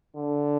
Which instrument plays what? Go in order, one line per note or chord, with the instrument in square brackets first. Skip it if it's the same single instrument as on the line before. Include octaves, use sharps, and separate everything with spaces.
[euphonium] D3